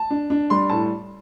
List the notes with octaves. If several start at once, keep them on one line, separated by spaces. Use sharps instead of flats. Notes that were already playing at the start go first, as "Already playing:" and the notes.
Already playing: A5
D4
D4
G3 C6
A2 A5